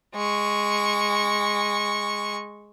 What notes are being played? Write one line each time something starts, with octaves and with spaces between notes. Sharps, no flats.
G#3 C#6